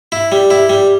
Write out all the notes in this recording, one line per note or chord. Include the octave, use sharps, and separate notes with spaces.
E4
G3
E4
G3